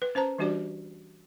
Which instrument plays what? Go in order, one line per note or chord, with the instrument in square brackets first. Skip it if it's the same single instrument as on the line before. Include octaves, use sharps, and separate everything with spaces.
[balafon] B4
C#4 C5 A5 A#5
E3 G3 D4 F#4 G4 D5